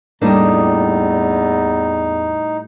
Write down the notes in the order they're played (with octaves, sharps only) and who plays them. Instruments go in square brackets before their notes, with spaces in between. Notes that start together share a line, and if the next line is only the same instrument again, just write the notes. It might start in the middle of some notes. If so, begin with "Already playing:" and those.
[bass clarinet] E2 [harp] A2 G3 D#5 [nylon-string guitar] A#3 D4 [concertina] D#4